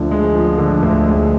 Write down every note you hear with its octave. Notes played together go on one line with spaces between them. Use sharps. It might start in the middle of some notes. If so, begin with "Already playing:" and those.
Already playing: D2 D3 F3
G#3
F3
D3
D2
G#3